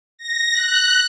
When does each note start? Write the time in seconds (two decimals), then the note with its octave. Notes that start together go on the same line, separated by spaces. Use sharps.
0.18 A#6
0.53 F#6